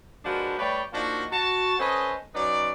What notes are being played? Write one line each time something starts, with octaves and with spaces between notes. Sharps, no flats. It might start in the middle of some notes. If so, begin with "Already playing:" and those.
F3 G#3 D4 F#4 A#4 B4
G3 A3 B4 C#5 D5 G5
F3 A#3 D4 D#4 F4 F#4
F#4 A5
C#4 A4 B4 C5 D#5
F#3 C#4 D#4 B4 D5